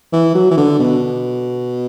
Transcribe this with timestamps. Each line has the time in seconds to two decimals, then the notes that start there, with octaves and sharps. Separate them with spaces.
0.13 E3
0.35 F#3
0.51 E3
0.57 D3
0.80 B2